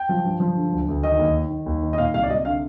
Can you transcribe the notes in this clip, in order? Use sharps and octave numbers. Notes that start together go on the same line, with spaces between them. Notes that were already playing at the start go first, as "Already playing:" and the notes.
Already playing: G5
F3
G2
F3
D3
D2
D2
D#3 D#5
D#2
D#3
D#3
D#2
D#3
D#5
A#2 F5
C2 F5
D5
C2 D#5
D3 F5